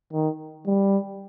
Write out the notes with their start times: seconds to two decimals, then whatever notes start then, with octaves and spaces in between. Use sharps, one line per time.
0.13 D#3
0.67 G3